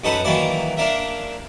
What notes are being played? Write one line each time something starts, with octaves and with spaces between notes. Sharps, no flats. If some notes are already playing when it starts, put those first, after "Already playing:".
F#2 D#4 A4 B4 F#5
D#3 E3 F#3 A#3 E4 D5
A#3 D4 A#4 E5